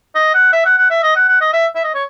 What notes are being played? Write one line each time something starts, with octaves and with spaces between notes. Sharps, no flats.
D#5
F#5
E5
F#5
F#5
E5
D#5
F#5
F#5
D#5
E5
E5
D#5
C#5